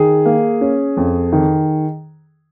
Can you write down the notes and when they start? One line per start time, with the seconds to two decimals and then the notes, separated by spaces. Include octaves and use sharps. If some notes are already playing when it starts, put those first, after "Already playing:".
Already playing: D#3 G#4
0.25 A#3
0.61 C#4
0.97 F2
1.33 D#3